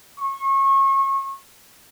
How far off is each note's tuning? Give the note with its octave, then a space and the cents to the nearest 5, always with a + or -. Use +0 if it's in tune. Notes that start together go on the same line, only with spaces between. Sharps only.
C#6 -30